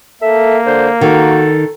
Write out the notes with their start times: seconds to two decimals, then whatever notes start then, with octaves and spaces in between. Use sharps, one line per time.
0.22 A#3 A4 E5
0.66 D3 C5
1.01 D#3 F#4 A4